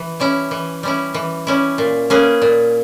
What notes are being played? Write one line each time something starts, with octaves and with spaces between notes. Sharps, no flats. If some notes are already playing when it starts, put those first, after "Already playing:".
Already playing: E3
G3 C#4 E4
E3
G3 C#4 E4
E3
G3 C#4 E4
A#2
A#3 C#4 G#4 B4
A#2